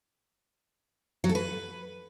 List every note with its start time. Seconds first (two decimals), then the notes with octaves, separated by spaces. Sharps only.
1.24 F#3
1.29 A4
1.35 B4